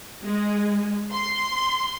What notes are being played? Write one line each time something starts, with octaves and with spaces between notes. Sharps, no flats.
G#3
C6